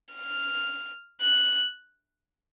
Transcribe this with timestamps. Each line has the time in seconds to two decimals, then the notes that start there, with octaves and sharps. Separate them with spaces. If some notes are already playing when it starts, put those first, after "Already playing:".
0.15 F6
1.21 F#6